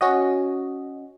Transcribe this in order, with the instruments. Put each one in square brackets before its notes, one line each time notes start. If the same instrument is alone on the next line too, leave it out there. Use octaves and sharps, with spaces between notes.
[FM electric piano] C#4 F#4 D#5